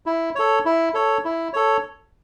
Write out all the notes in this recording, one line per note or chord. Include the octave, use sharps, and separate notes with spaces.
E4
A4 C#5
E4
A4 C#5
E4
A4 C#5